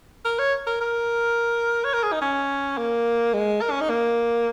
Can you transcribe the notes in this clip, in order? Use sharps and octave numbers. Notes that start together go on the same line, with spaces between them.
A#4
C#5
A#4
A#4
C#5
A#4
G#4
D#4
C#4
A#3
G#3
A#4
C#4
D#4
A#3